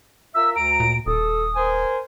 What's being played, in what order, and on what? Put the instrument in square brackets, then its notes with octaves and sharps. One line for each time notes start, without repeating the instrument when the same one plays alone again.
[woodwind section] F4 A#4 E5 [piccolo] E6
[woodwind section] D2 A#5 [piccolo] D7
[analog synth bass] A#2
[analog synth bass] D#1 [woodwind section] A4 [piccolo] D#6
[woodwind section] A#4 C5 G#5